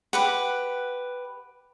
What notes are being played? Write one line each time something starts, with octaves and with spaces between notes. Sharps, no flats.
G4 B4 F#5